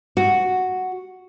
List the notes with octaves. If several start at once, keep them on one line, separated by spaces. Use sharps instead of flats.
F#4